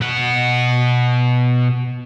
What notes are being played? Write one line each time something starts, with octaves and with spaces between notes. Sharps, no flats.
B2 F#5